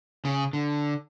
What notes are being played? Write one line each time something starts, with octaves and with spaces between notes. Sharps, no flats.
C#3
D3